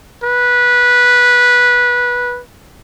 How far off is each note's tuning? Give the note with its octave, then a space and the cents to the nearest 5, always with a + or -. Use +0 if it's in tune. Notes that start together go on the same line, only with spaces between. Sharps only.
B4 -15